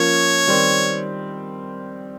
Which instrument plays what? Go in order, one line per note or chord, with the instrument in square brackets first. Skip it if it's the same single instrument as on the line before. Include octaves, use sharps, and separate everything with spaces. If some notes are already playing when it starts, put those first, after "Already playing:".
Already playing: [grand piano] F3 A#3 C#4 [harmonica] C#5
[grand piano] D#3 G3 C4